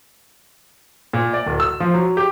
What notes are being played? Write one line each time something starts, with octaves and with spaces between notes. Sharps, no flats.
A#2
D5
D1
E6
F3
F#3
G4